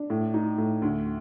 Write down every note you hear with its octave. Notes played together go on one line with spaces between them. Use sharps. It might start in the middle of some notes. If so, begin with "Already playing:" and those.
Already playing: D4
A2
D#4
A2
D2